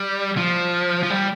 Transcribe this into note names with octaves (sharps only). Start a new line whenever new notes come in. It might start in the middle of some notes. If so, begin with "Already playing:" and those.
Already playing: G3
F3
F3
G3